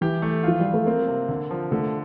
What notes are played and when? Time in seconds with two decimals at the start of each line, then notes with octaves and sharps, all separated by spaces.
0.01 E3 G4
0.22 A3
0.43 F3 F4
0.60 G3
0.65 F4
0.74 A3
0.86 A#3 C4
1.07 C3
1.29 D3
1.51 F3
1.71 D3 A3